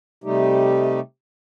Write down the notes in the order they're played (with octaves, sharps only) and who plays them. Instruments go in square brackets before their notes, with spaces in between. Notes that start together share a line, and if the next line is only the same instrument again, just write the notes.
[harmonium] C3 G3 A3 D#4 G4